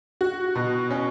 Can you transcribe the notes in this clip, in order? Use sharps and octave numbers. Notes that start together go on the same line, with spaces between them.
F#4
B2
C#4